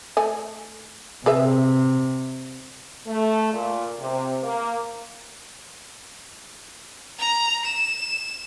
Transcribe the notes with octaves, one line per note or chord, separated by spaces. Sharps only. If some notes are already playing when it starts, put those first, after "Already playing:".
A3 G#5
C3 G#4 B4 E5
A3
A#2
C3
A#3
A#5
E7